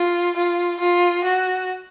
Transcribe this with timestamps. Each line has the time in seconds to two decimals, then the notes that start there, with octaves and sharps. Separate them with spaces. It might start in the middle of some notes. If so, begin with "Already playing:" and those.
Already playing: F4
0.36 F4
0.80 F4
1.24 F#4